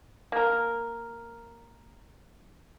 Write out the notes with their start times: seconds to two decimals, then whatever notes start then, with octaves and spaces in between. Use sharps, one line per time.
0.32 A#3 A#4